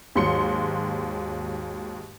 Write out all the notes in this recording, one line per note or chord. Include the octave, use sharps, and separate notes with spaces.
D#2 G#2 F#3 C6 C#7